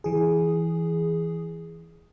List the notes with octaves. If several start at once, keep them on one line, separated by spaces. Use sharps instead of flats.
E3 G#4